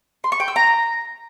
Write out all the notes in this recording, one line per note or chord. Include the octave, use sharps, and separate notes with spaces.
C6
C#6
G5
E6
A#5